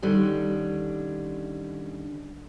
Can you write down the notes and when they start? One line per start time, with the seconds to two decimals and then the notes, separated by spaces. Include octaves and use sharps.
0.02 D3 D#3 G3 C#4